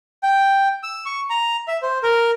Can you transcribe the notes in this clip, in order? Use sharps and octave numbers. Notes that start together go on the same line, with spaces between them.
G5
E6
C#6
A#5
E5
C5
A#4